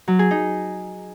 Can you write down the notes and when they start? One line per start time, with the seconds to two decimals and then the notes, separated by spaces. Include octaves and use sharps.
0.08 F#3
0.19 G#4
0.31 D#4